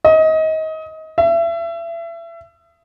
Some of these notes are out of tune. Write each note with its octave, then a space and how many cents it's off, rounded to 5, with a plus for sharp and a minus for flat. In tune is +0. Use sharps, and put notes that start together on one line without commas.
D#5 +25
E5 +30